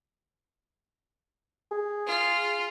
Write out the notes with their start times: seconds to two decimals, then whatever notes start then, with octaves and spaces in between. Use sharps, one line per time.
1.71 G#4
2.07 F4